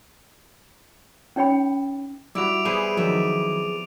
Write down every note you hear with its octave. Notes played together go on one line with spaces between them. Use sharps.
C#4 D#4 C#5 G5 B5
G3 E4 F#4 D6 D7 F7
G3 B3 G#4 C5 B5 D#7
F2 D#3 F#3 E5